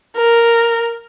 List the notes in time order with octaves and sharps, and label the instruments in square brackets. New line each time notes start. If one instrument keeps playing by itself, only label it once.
[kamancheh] A#4